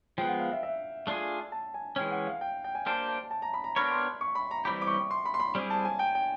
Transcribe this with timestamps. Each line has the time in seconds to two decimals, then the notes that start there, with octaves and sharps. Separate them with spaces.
0.18 F3 G#3 B3 G5
0.29 F#5
0.39 F5
0.52 E5
0.63 E5
1.07 A3 D4 F4 G#4
1.52 A5
1.74 G#5
1.96 E3 G#3 C#4 G5
2.12 F#5
2.27 F5
2.41 G5
2.64 G5
2.75 G#5
2.86 A#3 D4 G4 C5 A5
3.08 A5
3.31 A5
3.42 A#5
3.54 B5
3.64 A#5
3.76 B3 D4 G4 A#4 C#5 B5
3.91 C6
4.21 C#6
4.35 B5
4.51 A#5
4.65 E3 G3 C4 E4 G4 B5
4.82 D6
4.87 C#6
5.11 C6
5.25 B5
5.34 C6
5.39 B5
5.55 G3 C4 E4 G#4
5.70 A5
5.85 G#5
5.99 G5
6.15 G5